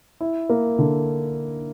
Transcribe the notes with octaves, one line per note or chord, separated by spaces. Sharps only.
E4
A#3
D3